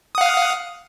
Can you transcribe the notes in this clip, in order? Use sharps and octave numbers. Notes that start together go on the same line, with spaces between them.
F5 F#5 D#6